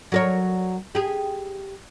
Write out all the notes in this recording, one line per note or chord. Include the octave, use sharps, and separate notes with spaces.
F#3 A#4 C#5
G4 G#4